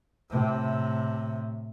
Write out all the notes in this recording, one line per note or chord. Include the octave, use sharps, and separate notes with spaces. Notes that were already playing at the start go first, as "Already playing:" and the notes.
A2 C3